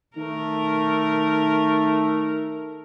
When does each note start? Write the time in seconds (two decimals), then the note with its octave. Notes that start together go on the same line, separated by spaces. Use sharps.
0.17 D#3 A3 A#4